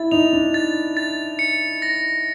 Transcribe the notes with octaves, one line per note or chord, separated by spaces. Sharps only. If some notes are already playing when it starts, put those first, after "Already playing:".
Already playing: E4 A6
D#4 F7
D4
A6
A6
C#7
A#6